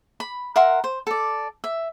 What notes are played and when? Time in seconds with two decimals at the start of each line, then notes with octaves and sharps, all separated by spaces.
0.20 B5
0.56 A#4 E5 F#5 C6
0.84 C5
1.07 A4 D5
1.64 E5